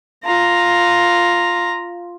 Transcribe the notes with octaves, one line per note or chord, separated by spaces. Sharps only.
F4 A#5